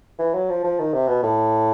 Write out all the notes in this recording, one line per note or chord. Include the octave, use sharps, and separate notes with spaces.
E3
F#3
F3
F3
D#3
C3
B2
A2